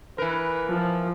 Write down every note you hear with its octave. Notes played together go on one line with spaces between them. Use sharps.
E3 A#4 B4
F3